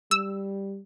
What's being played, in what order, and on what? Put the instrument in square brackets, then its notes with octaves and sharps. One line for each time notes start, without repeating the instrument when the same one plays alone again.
[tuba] G3 [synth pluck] E6